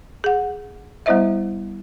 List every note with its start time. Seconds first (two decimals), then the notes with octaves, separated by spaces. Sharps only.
0.24 G#4 F#5
1.06 G3 B3 E4 C5 D#5 E5